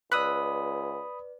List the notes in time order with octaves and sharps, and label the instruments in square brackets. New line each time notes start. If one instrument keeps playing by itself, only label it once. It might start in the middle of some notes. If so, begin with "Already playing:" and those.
[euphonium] C#2 [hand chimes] B4 D5 [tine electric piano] B5 D#6 [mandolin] E6 F#6